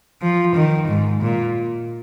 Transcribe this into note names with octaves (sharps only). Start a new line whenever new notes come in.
F3
D#3
G#2
A#2